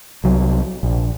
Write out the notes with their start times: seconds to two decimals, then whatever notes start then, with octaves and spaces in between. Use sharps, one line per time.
0.24 C2 F#3
0.83 A#1